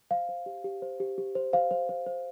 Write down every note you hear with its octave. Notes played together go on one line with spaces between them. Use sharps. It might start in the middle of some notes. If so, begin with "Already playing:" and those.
C5 F5
C5
G4
G4
C5
G4
G4
C5
C5 F5
C5
C5
C5